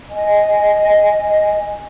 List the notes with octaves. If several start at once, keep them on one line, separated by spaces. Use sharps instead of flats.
D#5 G#5